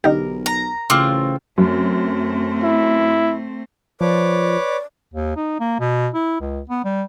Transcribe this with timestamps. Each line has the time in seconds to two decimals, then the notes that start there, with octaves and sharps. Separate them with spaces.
0.04 B1 D3 D#4 G4 A#4
0.46 A#5
0.90 A1 C#3 C4 F4 A5 C6 D6 F6
1.58 F#2 A3 C4
2.63 E4
4.01 F3 B4 C#5 D5 D6
5.14 D#2
5.36 D#4
5.60 A#3
5.80 B2
6.14 E4
6.40 C#2
6.70 B3
6.85 G3